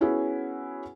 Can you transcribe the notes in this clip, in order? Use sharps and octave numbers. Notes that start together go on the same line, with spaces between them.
B3 C#4 E4 F#4 G#4